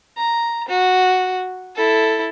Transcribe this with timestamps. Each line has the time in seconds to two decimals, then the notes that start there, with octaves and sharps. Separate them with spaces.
0.17 A#5
0.68 F#4
1.76 E4 A4